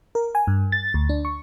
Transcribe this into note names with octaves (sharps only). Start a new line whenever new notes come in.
A#4
G#5
G2
A6
D2
D4
C#6